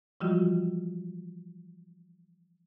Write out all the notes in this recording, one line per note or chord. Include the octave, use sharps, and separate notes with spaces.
E3 F3 G3 G#3 F4 F#4